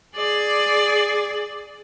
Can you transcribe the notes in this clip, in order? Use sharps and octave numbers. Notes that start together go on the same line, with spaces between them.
G#4 D5